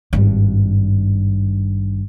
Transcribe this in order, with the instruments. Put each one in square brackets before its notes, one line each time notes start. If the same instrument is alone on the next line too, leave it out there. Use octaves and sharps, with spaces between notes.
[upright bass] G#1 G2